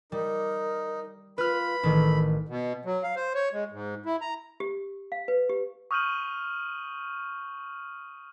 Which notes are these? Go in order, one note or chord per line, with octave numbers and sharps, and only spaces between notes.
G3 D#4 A#4
F4 B4 B5 F6
A1 D#3 A4
B2
F#3
F5
C5
C#5
G#3
G#2
E4
A#5
G4
F5
B4
G4
C#6 D#6 F6 G6 D#7 F#7